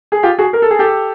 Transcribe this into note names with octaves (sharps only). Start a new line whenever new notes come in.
G#4
F4 G4
F#4 G#4
A#4
A4
G#4
G4 A4